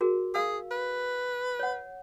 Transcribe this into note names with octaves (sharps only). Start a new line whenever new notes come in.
F#4 G#4 A#4
G#4 F5 E6
B4
C#5 F#5